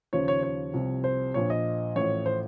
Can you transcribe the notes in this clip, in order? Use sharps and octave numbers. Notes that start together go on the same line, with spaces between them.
D#2 C#3 F3 C#5
C#5
C#5
C2 C3 F3
C5
A#1 A#2 F3 C#5
D#5
A1 A2 F3 C#5
C5